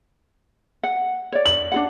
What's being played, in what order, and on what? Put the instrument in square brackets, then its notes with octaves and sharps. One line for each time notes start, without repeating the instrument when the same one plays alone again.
[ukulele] F#5
C#5 D5
[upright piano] F#7
[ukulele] D4 F#4 F#5